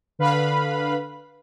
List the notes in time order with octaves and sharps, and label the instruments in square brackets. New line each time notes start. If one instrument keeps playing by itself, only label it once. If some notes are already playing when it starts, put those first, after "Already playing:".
[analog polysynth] D3 B4 F5 B5